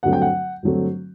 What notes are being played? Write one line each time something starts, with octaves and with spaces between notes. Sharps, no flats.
G2 D3 F#3 A3 C4 F#5
G5
F#5
G2 D3 F#3 A3 C4